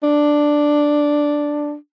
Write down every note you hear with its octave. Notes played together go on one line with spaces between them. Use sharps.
D4